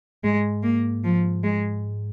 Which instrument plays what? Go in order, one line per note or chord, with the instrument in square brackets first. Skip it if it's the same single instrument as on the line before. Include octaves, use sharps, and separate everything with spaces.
[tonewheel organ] G#2 [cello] G#3
[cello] A#3
F3
G#3